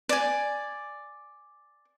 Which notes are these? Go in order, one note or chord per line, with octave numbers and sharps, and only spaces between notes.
D5 G#5